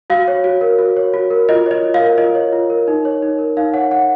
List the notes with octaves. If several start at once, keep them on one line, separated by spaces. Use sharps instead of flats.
F#4 F5
C#5
F#4
A#4
F#4
C#5
F#4
A#4
F4 D#5
C#5 D#5
F4
F5
A#4
F4 D#5
C#5
F4
A#4
D#4
C#5
D#4
A#4
D#4 F5
C#5 F#5
D#4 F#5